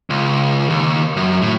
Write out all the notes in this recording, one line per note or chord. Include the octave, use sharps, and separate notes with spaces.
C#2
D#2
F#2
A2